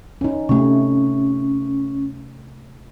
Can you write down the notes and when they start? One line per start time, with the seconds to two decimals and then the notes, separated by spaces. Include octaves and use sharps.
0.21 C#4 D#4
0.49 C3 A3 C#4